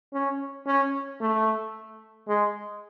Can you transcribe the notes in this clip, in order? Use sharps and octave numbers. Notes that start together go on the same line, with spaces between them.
C#4
C#4
A3
G#3